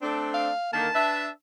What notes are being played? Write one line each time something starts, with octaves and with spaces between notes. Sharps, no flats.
A3 C4 D4
F5
D3 D#3 A#3 A5
D4 B4 E5